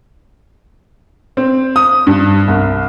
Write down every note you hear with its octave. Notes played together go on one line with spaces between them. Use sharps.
C4
D#6
G2
C2